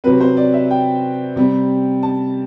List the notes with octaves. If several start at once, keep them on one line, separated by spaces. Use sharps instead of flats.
C3 F#3 C4 B4
C5
D5
E5
G5
C3 G3 C4
A5